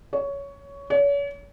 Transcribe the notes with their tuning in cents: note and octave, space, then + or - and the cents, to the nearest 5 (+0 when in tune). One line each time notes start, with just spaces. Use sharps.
C#5 +15
C#5 +40